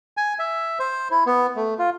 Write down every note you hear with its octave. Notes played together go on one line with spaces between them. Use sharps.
G#5
E5
C5
E4
B3
A3
F4